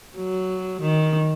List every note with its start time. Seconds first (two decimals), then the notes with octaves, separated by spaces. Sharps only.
0.16 F#3
0.81 D#3